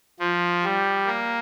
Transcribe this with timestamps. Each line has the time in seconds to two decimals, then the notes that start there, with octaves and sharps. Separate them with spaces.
0.20 F3
0.64 G3
1.06 A#3